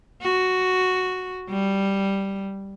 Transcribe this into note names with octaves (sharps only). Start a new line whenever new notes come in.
F#4
G3